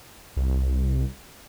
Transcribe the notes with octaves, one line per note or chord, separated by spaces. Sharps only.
C2